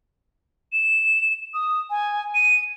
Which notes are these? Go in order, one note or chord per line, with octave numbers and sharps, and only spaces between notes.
E7
D#6
G#5
D#7